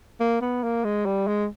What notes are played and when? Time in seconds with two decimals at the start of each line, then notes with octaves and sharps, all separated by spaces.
0.20 A#3
0.41 B3
0.63 A#3
0.84 G#3
1.06 G3
1.27 G#3